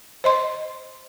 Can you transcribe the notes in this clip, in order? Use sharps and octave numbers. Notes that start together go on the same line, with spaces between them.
C5 D#5 C6